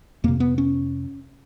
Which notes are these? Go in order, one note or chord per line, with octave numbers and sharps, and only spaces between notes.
F2 C3 A#3
B3
C#4